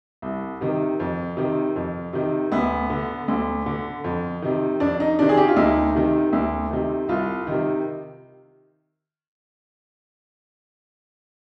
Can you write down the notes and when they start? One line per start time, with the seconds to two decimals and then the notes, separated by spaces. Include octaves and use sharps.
0.22 C2
0.61 C3 D#3
1.00 F2
1.37 C3 D#3
1.76 F2
2.13 C3 D#3
2.52 D2 B3
2.90 D3
3.28 D2
3.66 D3
4.04 F2
4.42 C3 D#3
4.80 F2 D4
5.00 D#4
5.19 C3 D#3 D4
5.29 G#4
5.37 G4
5.48 F4
5.56 D2 D#4
5.95 C3 D#3
6.33 D2
6.71 C3 D#3
7.09 C2 F4
7.47 C3 D#3